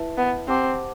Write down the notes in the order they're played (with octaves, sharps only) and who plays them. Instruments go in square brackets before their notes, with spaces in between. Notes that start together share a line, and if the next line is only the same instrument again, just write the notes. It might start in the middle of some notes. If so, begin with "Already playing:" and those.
Already playing: [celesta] E4 B4 E5 A5
[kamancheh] B3
[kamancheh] C4 [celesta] G4 C5 F#5 A5 D6